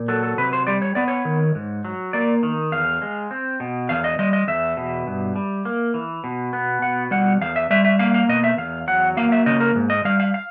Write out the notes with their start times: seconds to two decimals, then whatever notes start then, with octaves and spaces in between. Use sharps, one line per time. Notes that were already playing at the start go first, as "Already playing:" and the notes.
Already playing: A#2
0.08 F#3 A4
0.23 A4
0.38 C3 B4
0.53 C5
0.67 G3 D5
0.82 C#5
0.95 B3 D5
1.08 C#5
1.25 D#3
1.55 G#2
1.85 F#3
2.13 A#3 D5
2.43 D#3
2.72 E2 F5
3.02 G#3
3.31 C4
3.60 B2
3.89 E2 F5
4.04 D#5
4.19 G3 D#5
4.33 D#5
4.48 E2 E5
4.77 B2
5.07 G2
5.36 G3
5.65 A#3
5.94 E3
6.24 B2
6.53 B3
6.82 B2 F#5
7.11 G3 F#5
7.41 E2 F5
7.56 E5
7.70 G3 E5
7.85 E5
7.99 A#3 F5
8.14 F5
8.29 B2 D#5
8.44 E5
8.58 E2 F5
8.88 F#3 F#5
9.17 A#3 F5
9.32 E5
9.46 C#3 D#5
9.60 A#4
9.75 G#2
9.90 D#5
10.05 G3 F5
10.20 F5
10.34 F5